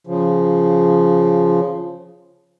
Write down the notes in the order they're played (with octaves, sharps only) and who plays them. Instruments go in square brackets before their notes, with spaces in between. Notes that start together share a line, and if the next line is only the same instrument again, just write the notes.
[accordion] C#3 F3